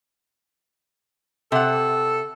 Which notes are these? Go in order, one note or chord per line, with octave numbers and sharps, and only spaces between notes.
C3 A4 F#5